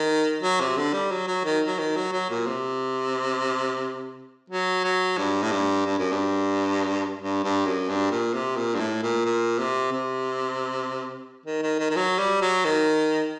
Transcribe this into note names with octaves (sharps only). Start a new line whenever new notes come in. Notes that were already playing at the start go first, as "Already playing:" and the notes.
Already playing: D#3
F#3
C3
D3
G3
F#3
F#3
D#3
F#3
D#3
F#3
F#3
A#2
C3
F#3
F#3
G2
A2
G2
G2
F#2
G2
G2
G2
F#2
G2
A#2
C3
A#2
G2
A2
A#2
A#2
C3
C3
D#3
D#3
D#3
D#3
F#3
G3
F#3
D#3